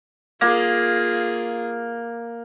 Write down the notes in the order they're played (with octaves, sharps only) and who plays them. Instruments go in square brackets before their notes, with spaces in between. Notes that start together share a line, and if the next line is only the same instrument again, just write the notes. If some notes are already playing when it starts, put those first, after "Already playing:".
[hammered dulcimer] A#3 [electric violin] F4 G#4